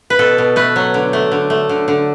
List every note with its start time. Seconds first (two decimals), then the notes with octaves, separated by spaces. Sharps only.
0.10 B4
0.19 B2 A4
0.38 B2
0.56 A3 B4
0.76 F#3
0.94 D3
1.13 A3
1.31 D3
1.50 A3
1.69 D3
1.88 D3